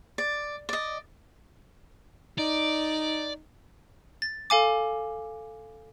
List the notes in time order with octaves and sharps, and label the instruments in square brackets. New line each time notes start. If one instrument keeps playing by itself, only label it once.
[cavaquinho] D5
D5 D#5
[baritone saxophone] D#4 [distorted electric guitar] D5
[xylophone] A6
A4 F5 G#5 D6